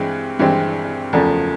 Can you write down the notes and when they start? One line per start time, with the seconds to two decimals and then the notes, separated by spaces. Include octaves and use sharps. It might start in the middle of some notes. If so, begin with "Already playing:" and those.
Already playing: G2 E3 G#3 C4
0.39 G2 E3 G#3 C4
1.13 F#1 E2 C#3 F3 A3